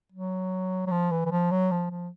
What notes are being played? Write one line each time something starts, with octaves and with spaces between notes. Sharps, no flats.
F#3
F#3
F3
E3
E3
F3
F#3
F3
F3